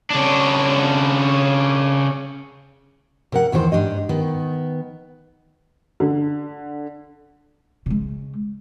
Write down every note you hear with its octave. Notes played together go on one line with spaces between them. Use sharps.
C#3 D4
C3 A#4 F#5
E2 D#3 E3 G#4 C5
G#2 D4 G4 D#5
D#3 B3
D3
C#3 G#3